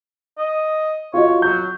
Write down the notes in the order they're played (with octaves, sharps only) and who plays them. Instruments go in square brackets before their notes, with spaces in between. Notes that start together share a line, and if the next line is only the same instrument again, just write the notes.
[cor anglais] D#5
[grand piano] F4 F#4 D#5 [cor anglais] C#5
[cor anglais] F#3 [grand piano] G6